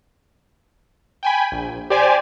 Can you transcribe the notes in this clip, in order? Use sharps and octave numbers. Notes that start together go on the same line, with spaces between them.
G5 G#5 B5
A#1
G4 C5 D5 G#5